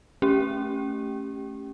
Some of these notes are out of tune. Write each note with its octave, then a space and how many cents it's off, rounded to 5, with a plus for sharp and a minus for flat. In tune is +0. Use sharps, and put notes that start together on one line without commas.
A3 +0 C#4 +0 G4 +0